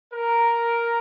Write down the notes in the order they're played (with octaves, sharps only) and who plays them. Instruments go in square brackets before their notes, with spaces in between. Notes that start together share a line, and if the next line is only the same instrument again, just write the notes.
[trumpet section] A#4